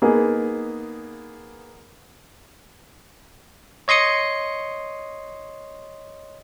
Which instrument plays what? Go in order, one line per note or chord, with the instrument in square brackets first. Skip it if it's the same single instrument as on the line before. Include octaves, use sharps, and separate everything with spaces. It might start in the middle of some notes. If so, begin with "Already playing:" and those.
[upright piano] A#3 B3 D#4 G#4
[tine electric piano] C#5 D#5 C6 D#6 C#7